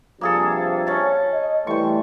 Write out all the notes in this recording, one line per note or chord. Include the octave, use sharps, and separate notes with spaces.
G2 C3 F3 A#3 G#4 A4
C#4 A5
D#5
E3 G3 A3 C5 C#6